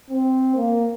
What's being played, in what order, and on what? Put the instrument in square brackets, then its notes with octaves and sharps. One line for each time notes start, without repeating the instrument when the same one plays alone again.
[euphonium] C4
A#3